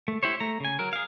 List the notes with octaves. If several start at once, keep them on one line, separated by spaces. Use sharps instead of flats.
A3
E4 G4 C5 C#5
A3 A#5
C#3 G#5
F#3 A#4
G#4 F5